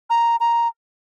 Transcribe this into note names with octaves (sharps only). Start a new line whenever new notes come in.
A#5
A#5